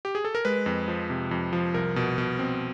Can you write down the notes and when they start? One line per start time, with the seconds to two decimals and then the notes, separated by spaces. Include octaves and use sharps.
0.05 G4
0.15 G#4
0.25 A4
0.35 A#4
0.45 G#3 B4
0.66 F2
0.88 F3
1.10 C3
1.31 F2
1.53 F3
1.74 C2 A#4
1.96 B2
2.18 B2
2.39 C4